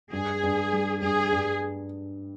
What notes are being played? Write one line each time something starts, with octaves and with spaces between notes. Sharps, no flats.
G2 G#4
G2
G3
G2 G#4
G2